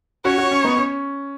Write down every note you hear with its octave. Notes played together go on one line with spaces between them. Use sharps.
C#4 F#4 C#5
C#4 F#4
C#4
B3 D#4
C#4